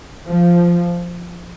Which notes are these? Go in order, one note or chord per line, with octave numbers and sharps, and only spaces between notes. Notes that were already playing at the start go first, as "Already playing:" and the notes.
F3